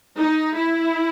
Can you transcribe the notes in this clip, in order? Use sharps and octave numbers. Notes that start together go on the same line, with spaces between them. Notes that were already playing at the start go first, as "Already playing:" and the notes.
D#4
E4